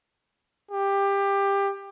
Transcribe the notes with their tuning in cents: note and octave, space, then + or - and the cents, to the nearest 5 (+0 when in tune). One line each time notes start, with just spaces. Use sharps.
G4 +20